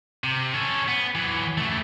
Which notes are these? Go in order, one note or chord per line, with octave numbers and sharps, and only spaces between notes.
C3
C#4 A4
B3
E3 F#3
C#3 A3